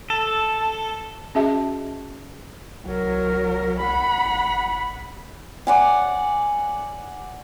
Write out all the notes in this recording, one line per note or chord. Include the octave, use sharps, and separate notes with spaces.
A4
C#4 F#4 G#4 D#5 E5 A5
C2 F#3 A#4
F#5 B5
G1
D5 F#5 G#5